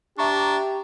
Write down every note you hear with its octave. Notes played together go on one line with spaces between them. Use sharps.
D4 G4 E5 A#5 C#6